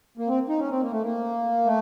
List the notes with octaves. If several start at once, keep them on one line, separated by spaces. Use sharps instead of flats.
A#3
C4
D#4
C#4
C4
A#3
A3
A#3
A3